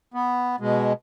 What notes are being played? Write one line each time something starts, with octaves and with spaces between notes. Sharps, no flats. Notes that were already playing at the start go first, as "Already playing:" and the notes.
B3
B2 G#3